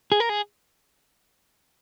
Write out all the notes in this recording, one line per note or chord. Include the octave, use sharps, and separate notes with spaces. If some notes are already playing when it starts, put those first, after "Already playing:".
G#4
A#4
G#4